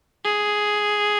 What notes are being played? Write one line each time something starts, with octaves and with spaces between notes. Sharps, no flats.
G#4